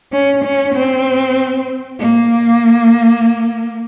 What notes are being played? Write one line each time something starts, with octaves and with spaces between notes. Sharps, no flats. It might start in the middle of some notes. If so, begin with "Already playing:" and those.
C#4
C#4
C4
A#3